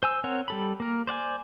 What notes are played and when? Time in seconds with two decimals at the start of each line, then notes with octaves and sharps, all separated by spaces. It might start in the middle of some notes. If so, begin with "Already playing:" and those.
0.03 C5 G#5 E6
0.24 C4 A#4 C#5 F#5
0.48 G3 A4 B5
0.80 A#3 A#4
1.07 C5 D5 F#5 G#5